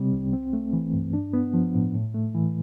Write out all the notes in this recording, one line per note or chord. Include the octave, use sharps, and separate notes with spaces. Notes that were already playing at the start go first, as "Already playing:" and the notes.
Already playing: C3 G3 C4
C2
C4
A3
E3
G2
D4
B3
F3
A2
A2
A3
E3